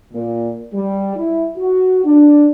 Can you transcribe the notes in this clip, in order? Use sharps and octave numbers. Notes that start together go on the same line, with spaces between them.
A#2
G3
E4
F#4
D4